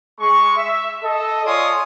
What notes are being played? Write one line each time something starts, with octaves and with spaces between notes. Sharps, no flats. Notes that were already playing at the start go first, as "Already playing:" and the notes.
G#3 C#6
E5
A4 D#5
F4 C#5 D5 G#5 C6 D#6